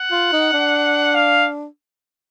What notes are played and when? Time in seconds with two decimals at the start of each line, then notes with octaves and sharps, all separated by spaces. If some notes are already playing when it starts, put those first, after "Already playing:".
Already playing: F#5
0.11 F4
0.32 D#4
0.53 D4
1.15 F5